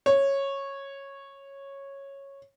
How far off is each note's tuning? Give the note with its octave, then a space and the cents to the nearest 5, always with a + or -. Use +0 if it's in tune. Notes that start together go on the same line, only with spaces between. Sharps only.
C#5 -10